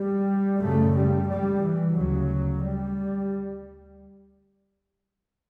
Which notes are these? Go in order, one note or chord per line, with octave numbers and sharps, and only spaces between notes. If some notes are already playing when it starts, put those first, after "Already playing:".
Already playing: G3
F#2 C#3 A3
G3
G3
E3
D2 C#3 F#3
G3